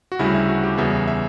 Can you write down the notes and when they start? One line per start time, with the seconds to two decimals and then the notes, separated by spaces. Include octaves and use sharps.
0.12 F#4
0.19 D2 C#3 G3 E4
0.35 E4
0.48 F#4
0.64 G4
0.77 E2 C#3 G3 B3 E5
1.07 E5